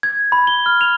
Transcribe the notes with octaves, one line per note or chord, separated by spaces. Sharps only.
G#6
B5
G7
F6
F7